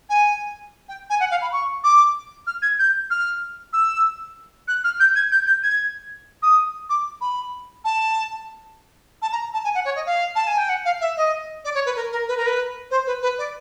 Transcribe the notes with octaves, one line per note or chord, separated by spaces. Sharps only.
G#5
G5
G#5
F#5
F5
B5
C#6
D6
F6
G#6
G6
F6
E6
F#6
F6
G6
G#6
G6
G6
G#6
D#6
D6
B5
A5
A5
A#5
A5
G#5
F#5
C#5
D#5
F5
A5
G#5
G5
F#5
F5
E5
D#5
D5
C#5
B4
A#4
A#4
B4
A#4
B4
C5
B4
B4
D5